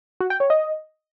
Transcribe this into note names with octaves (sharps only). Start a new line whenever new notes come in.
F#4
G5
C#5
D#5